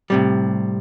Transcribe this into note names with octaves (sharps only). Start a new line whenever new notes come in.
A2 C3 G3